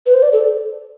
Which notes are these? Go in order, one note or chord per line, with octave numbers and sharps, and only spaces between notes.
B4
C5
D5
A4